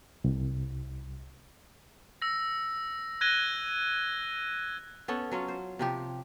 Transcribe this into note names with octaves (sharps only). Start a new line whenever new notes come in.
C2
E6 A#6
F#6 G#6 A#6 D#7 G7
B3 C#4 A4
F#3 C#4 F4
C5
C3 F3 G4